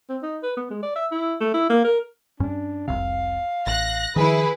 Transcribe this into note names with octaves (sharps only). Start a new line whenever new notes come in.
C4
D#4
B4
B3
G#3
D5
E5
E4
A3
E4
A#3
A#4
G2 C#4 D4
F1 C2 C3 F5
A1 F#6 A#6
D#3 F3 E4 G#4 B4